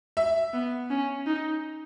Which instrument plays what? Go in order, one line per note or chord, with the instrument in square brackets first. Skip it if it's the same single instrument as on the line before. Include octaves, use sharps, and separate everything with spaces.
[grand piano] E5
[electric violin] B3
C#4
D#4